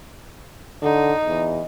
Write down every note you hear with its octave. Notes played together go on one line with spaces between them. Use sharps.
D3 D#4
E2